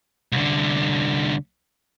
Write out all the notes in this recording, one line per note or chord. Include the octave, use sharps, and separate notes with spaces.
C2 D3